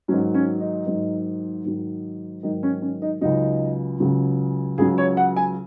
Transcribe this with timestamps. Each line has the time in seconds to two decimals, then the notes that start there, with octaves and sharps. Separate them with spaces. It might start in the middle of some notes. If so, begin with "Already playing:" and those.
0.08 G#2 D#3 F#3 C#4
0.34 C#4
0.60 D#4
0.86 G#2 D#3 F#3
1.64 G#2 D#3 F#3
2.43 G#2 D#3 F#3 D#4
2.63 C#4
2.82 C#4
3.02 D#4
3.21 C#2 C#3 F#3 D#4
4.00 C#2 C#3 F#3
4.78 C#2 C#3 F#3 G#4
4.98 C#5
5.17 F#5
5.36 G#5